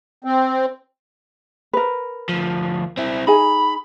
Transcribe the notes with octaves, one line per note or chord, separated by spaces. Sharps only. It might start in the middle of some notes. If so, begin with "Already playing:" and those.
C4
A#4 B4
D2 F3
C4 E4
D#4 G#4 G#5 B5